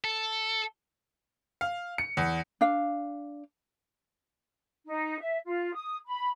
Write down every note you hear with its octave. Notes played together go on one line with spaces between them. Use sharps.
A4
F5
C#7
E2
D4 F5
D#4
E5
F4
D#6
B5